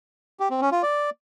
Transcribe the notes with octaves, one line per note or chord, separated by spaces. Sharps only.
G4
C4
C#4
F4
D5